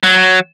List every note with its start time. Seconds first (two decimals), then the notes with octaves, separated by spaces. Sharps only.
0.03 F#3